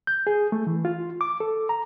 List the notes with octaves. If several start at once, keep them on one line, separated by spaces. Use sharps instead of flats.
G6
G#4
A3
E3
F4
D6
A4
A#5